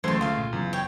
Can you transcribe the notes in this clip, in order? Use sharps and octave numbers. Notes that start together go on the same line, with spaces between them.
C#2 E3 F#3 A3 C5 C6 G#6
D3 F4 F5
A#2
F#1 E2 C#3 F#3
C#5 G5